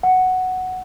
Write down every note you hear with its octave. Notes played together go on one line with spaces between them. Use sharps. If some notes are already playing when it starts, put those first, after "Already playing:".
F#5